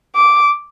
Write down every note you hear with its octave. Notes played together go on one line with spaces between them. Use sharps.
D6